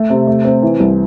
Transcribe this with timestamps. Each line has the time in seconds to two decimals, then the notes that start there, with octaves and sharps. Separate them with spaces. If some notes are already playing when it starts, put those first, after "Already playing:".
Already playing: A3
0.10 C3
0.27 A3
0.45 C4
0.63 E3
0.80 C2